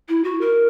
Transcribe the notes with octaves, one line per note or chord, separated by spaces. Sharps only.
E4
F#4
A#4